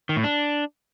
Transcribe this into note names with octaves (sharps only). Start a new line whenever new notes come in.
D#3
A2
D4